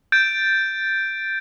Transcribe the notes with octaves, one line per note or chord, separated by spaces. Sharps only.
G6 A6 D7